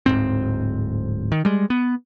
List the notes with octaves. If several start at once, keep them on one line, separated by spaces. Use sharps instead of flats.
D1 G#2 C4
D#3
G3 G#3
B3